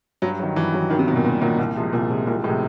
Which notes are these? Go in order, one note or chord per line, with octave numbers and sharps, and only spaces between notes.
G2 F#3
D#3 F#3
G2 E3
D#3 F#3
G2 D#3
C3
A#2 B2 D#3 F#3
G2 A#2
A#2 D#3 F#3
C2 A#2
C3 F3 G#3
C2 A#2
C3 F3 G#3
C2 A#2
A2 C3 F3 G#3